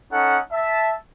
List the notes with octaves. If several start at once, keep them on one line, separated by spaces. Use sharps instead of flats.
C#4 D#4 A4 F#5
E5 A5